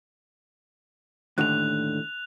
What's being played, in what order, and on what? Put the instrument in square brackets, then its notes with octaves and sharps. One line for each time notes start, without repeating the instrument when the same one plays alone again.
[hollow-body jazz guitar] D#2 A2 D3 [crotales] F#6 F7